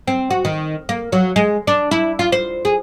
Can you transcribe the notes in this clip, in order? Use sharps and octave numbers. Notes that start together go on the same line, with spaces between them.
C4
F#4
D#3
A#3
F#3
G#3
D4
E4
F4
C5
G#4